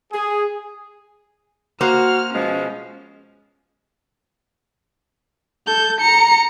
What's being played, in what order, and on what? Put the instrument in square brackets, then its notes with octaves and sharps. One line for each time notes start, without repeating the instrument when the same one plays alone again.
[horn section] G#4
[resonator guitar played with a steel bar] A#3 C5 [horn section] F#4 [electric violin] F6
[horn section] B2 F3 G#3 [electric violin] C#4
[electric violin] A4 G6
A#5 C#7